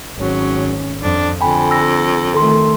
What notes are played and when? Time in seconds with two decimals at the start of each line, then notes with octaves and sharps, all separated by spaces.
0.16 G#1 F#3 C#4
1.02 F2 D4
1.41 F2 D3 G5 G#5 B5
1.71 E6 A#6
2.34 D#3 A3 A4 C6